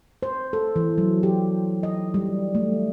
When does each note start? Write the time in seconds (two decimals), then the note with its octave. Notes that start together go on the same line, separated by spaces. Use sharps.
0.23 C5
0.53 A4
0.76 E3
0.98 F#3
1.23 G4
1.83 D#5
2.14 G3
2.55 A3